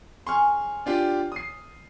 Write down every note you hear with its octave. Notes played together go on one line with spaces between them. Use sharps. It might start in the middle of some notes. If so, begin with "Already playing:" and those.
C#4 G#4 C6 C#6 F6
D4 F4 G4
D#6 C7